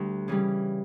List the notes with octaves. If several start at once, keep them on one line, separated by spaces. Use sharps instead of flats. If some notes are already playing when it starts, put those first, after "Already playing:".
Already playing: D2 G3
C#3 E3 G3